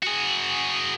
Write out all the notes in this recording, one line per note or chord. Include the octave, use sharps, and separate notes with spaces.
F#4 G#4